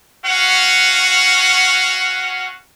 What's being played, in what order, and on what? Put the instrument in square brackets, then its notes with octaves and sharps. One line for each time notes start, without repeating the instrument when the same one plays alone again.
[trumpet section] C#4 F#4 F5 F#5